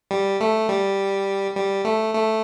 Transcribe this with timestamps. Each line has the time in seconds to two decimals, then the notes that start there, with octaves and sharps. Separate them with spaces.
0.11 G3
0.40 A3
0.69 G3
1.55 G3
1.85 A3
2.14 A3